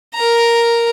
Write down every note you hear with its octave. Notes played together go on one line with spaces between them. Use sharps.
A#4 A#5